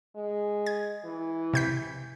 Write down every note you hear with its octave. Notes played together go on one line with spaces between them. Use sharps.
G#3
G#6
E3
C3 G6 B6